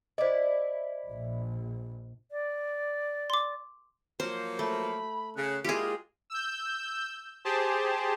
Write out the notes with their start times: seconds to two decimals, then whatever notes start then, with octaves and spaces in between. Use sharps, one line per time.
0.18 E4 C5 D5 D#5
1.09 A#1
2.31 D5
3.30 C6 D6
4.20 F3 F#3 A#3 C5
4.59 A3 B5
5.36 C#3 F#6
5.64 G#3 A#3 E4 F4 G4 G#4
6.30 E6 G6
7.45 G4 G#4 C5 A5